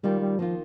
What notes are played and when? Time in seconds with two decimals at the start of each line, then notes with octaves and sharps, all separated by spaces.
0.03 D#3 G3 A#3 F4
0.21 G3
0.39 D#3 F3 A#3 F4